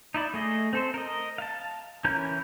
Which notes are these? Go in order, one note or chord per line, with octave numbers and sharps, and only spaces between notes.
D#4 E4 D5
A3 G#4 D#5
C4 A4 C5
A#4 D#5
F5 A5
E3 C#4 E4 A#4 G6